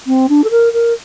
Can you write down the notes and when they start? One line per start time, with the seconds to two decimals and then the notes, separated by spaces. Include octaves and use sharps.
0.07 C4
0.29 D4
0.44 A4
0.51 A#4
0.73 A#4